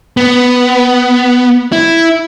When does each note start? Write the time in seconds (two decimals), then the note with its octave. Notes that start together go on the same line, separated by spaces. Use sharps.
0.17 B3
1.72 E4